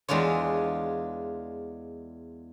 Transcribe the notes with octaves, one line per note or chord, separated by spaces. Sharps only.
E2 G#3 D4 F4 C#5